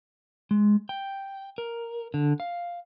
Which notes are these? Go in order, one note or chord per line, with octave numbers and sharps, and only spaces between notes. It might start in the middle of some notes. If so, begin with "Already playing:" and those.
G#3
G5
A#4
D3
F5